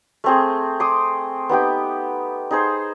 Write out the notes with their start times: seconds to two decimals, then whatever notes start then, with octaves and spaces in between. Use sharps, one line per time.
0.24 A3 C4 G#4
0.80 C6 D6 D#6
1.49 B3 D#4 G4 G5
2.51 D#4 G#4 C5